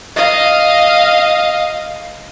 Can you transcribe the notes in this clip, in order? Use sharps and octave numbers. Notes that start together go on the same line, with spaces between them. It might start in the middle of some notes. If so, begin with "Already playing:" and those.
D#5 F5